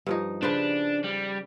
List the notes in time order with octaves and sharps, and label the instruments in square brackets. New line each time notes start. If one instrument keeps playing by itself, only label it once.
[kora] G2 F3 D#4
[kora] C#3 B4 C5 [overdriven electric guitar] D4
[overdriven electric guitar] G3